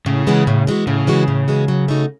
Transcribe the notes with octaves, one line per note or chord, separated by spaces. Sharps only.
A2 C#3
E3 G#3 B3 F#4
A2
E3 G#3 B3 F#4
A2 C#3
E3 G#3 B3 F#4
A2
E3 G#3 B3 F#4
F#3
A3 D#4 F#4